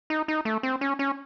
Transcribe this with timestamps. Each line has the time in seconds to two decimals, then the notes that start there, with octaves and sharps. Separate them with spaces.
0.10 D#4
0.28 D#4
0.45 A3
0.63 C4
0.81 C#4
0.99 C#4